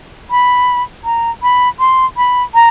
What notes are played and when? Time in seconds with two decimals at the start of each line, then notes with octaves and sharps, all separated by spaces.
0.31 B5
1.04 A#5
1.43 B5
1.80 C6
2.17 B5
2.54 A#5